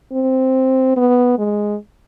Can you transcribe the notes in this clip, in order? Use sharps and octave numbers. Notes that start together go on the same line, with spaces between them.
C4
B3
G#3